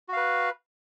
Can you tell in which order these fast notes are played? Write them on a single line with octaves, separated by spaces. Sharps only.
F#4 F5 B4